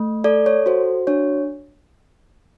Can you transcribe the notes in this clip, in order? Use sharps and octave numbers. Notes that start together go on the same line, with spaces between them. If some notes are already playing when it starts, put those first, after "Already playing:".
Already playing: A3
A4 D5
C#5
F#4 C5
D4 C#5